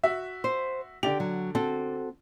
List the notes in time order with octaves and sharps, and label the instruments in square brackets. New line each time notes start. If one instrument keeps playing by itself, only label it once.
[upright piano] F#4 E5
[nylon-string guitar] C5
[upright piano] D3 D5 F7 [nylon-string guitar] G4
[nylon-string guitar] F#3
C4 F#4 A4